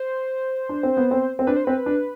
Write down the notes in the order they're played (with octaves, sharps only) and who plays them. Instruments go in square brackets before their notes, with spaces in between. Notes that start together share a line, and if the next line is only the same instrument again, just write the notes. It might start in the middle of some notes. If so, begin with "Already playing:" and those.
Already playing: [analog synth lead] C5
[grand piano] D4
C4
B3
C4
C4
[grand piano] D4 [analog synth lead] B4
[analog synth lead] C5
[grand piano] C4 [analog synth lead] B4
[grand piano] D4